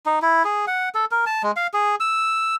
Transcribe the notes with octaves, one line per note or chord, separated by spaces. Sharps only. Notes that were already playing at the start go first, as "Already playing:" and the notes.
D#4
E4
G#4
F#5
A4
A#4
A5
G#3
F5
G#4
E6